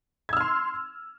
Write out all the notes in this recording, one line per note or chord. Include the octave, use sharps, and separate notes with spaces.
C6 E6 F6 G#6